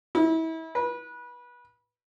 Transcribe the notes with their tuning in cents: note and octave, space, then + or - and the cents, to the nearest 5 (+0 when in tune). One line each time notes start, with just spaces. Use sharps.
E4 -30
B4 -25